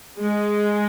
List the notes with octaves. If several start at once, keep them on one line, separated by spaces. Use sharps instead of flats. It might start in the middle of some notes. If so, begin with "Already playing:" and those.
G#3